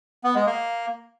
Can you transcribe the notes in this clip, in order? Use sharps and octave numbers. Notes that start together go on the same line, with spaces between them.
B3
G#3
A#3